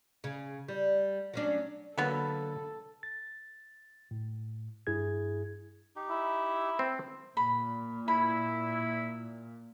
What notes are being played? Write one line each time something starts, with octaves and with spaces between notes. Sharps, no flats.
C#3
G3
F#3 C#4 D4
D3 F#3 A#3 B3 A4 B4
A6
A2
G2 E4 G#4 G#6
D#4 G4
E4
C4
A#2 B5
E4 B5